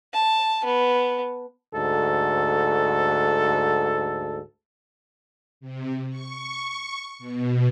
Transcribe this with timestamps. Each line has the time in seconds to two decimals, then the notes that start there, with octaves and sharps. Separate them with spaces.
0.13 A5
0.65 B3
1.74 D2 G#2 A4
5.60 C3
6.09 C#6
7.19 B2